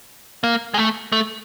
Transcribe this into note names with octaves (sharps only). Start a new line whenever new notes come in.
A#3
G#3
A3
A3